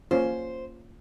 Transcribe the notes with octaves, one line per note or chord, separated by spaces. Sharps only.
A#3 C#4 F4 C5